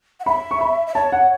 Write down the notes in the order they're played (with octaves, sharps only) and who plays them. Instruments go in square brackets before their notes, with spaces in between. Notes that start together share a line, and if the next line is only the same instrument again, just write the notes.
[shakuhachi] F#5
[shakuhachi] E5 [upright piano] B5
[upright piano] C#6
B5
[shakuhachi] E5
[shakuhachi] C#5 [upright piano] A5
[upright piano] F#5